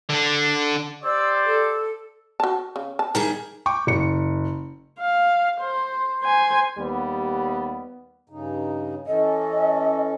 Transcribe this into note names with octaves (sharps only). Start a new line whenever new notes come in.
D3 D4
G4 C5 D5 E6
A4
F#4 A5
C#3
A5
D#3 G3 G#4 A#5
G5 C#6 D6
F#1 C#7
F5
C5
C5 G#5
D#2 G3 B3
G2 C#3 D#4
E3 C#4 A4 D#5